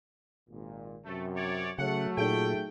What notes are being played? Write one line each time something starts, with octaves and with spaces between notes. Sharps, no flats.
G#1 A#2
F#2 C3 A3
C#5 D5
C#3 F#3 A3 F#5
A#2 D#4 G#4 A4 G5